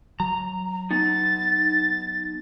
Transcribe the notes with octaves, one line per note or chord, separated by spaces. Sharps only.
F#3 A#5
B3 D#4 A6